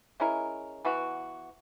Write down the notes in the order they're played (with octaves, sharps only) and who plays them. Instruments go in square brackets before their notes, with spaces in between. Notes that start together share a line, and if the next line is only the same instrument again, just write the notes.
[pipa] G#3 C#4 E4 A#4
E3 B3 F#4